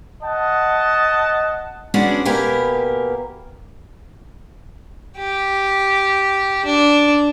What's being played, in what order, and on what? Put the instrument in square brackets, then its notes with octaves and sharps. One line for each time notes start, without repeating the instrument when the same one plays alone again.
[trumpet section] D#5 F#5 A5
[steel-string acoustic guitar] G#3 B3 C#4 D4 F#4 D5
B2 A#3 G4 A#4 B4 G#5
[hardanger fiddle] G4
D4